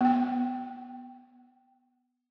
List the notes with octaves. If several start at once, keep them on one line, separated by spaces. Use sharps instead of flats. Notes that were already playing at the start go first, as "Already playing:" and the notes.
B3 G5